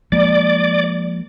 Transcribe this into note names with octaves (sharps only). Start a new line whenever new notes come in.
F3 G#3 A#3 D5